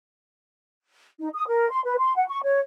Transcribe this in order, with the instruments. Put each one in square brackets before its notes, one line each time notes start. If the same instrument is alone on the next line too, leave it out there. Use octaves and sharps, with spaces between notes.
[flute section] D#4
D#6
A#4
C6
B4
C6
F#5
C#6
C#5